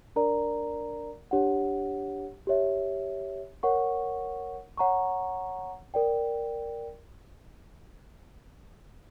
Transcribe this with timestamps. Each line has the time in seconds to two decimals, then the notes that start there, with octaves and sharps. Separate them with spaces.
0.16 D4 A#4 D5 A#5
1.31 D4 G4 C#5 F#5
2.47 G4 C#5 E5
3.63 A#4 C#5 F#5 C#6
4.78 C#5 F#5 A#5 C#6
5.94 A#4 D5 G5